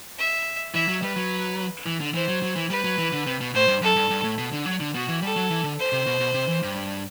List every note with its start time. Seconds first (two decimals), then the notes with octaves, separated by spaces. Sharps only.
0.18 E5
0.74 E3 E5
0.88 F#3
1.02 G3 B4
1.16 F#3
1.86 E3
2.00 D3
2.14 E3 C5
2.28 F#3
2.42 F#3
2.56 E3
2.70 G3 B4
2.85 F#3
2.98 E3
3.13 D3
3.26 C3
3.41 B2
3.54 A2 C5
3.68 G2
3.82 F#2 A4
3.96 G2
4.10 G2
4.24 A2
4.38 B2
4.53 D3
4.66 F#3
4.80 D3
4.94 B2 F#4
5.08 E3
5.22 G3 A4
5.36 F#3
5.50 E3
5.64 D3
5.78 C5
5.92 C3
6.07 B2
6.20 B2
6.34 C3
6.48 E3
6.63 G2